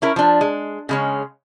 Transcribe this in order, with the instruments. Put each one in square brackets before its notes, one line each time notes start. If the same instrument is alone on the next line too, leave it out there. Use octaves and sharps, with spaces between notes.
[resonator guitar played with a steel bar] C#4 E4 A#4
F3 D4
G#3
C#3 G#3 C#4